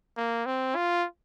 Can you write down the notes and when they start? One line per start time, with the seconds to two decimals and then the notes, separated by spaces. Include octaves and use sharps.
0.17 A#3
0.46 C4
0.76 F4